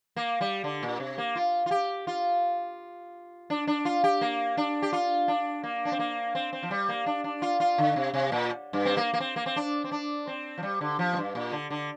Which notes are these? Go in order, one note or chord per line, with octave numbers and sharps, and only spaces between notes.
A#3
G3
D3
A#2
C3
A#3
F4
F4
G4
F4
D4
D4
F4
G4
A#3
D4
G4
F4
D4
A#3
D4
C4
A#3
C4
C4
F3
G3
A#3
D4
D4
F4
F4
D3
C3
C3
A#2
G2
C4
A#3
A#3
C4
A#3
C4
D4
C4
D4
C4
F3
G3
D3
F3
A#2
G2
A#2
D3
D3